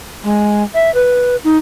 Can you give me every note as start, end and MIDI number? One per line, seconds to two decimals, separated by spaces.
0.24 0.63 56
0.74 0.92 76
0.94 1.36 71
1.44 1.57 63